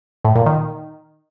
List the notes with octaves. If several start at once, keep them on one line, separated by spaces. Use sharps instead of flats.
A2
A#2
D#3